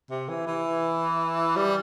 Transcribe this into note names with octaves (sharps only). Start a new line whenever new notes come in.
C3
E3
E3
G3